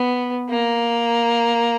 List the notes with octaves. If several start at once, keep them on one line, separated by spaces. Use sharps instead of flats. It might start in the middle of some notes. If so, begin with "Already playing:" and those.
Already playing: B3
A#3